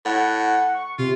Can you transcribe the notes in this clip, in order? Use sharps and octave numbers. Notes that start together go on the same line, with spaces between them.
A2 F#5
C#6
C3 F4